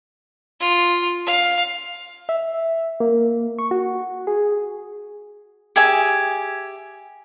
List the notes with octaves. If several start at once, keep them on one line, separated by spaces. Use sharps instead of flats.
F4
F5
E5
A#3
C#6
F#4
G#4
G4 G#4 E5 G#5